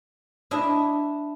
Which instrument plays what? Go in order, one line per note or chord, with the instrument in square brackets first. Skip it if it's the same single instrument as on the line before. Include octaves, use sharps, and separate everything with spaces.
[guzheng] D4 E4 D#5